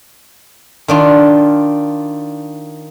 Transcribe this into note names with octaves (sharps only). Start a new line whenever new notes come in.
D#3 D4 F4